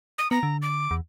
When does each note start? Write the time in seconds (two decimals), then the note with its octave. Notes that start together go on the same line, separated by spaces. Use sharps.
0.18 D#6
0.31 B3 A#5
0.43 D3
0.62 D6
0.91 E2